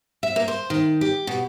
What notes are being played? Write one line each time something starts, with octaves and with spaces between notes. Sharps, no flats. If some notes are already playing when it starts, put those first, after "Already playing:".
E5
A#3
C5
D#3
G4
B2